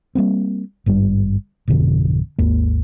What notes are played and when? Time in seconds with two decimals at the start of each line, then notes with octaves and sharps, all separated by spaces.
0.15 G3 A#3 C4
0.86 G#1 G2 D#3 G3
1.68 G#1 F2 B2 D3
2.38 G#1 D#2 A#3